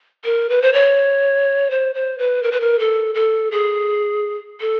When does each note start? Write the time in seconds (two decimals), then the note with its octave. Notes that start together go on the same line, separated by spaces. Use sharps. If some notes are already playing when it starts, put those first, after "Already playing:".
0.24 A#4
0.50 B4
0.62 C5
0.73 C#5
1.71 C5
1.95 C5
2.18 B4
2.43 A#4
2.51 B4
2.61 A#4
2.79 A4
3.15 A4
3.51 G#4
4.61 A4